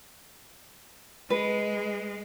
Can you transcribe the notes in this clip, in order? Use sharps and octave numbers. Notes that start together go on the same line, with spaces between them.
G#3 B4